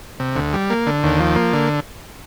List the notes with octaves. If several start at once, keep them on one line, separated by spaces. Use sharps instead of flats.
C3
D2
G3
A#3
D3
D#2
F3
A#3
D3